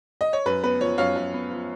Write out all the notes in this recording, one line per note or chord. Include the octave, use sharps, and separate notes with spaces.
D#5
C#5
F#2 B4
B3 B4
F3 C#5
F#2 C#5 F5
F#2
B3
F3